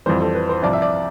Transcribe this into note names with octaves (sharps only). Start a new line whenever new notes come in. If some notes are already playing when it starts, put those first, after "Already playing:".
F2 E3 G3 C5
A4
B4
C5
C2 C3 F3 D5
E5
D5